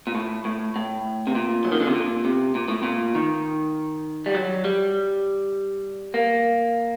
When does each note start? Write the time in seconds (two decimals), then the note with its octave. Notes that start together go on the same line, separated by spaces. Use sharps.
0.07 A#2
0.15 A2
0.45 A2
0.76 A2
1.27 C3
1.35 A#2
1.65 F#3
1.72 D#3
1.80 D3
1.87 C3
1.95 A#2
2.25 C3
2.55 A#2
2.68 A2
2.83 A#2
3.15 D#3
4.26 G3
4.35 F#3
4.65 G3
6.14 A#3